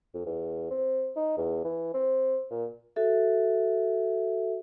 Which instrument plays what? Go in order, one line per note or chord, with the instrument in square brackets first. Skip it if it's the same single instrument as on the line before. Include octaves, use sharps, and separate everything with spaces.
[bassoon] F2
E2
C4
D#4
E2
E3
C4
A#2
[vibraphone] F#4 A4 E5